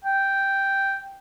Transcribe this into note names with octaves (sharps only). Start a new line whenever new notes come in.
G5